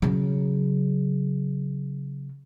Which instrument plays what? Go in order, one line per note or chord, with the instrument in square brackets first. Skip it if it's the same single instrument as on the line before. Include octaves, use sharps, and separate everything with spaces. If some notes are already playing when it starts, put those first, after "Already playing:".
[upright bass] C#3 F#3